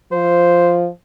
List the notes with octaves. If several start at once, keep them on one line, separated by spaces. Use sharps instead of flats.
F3 C5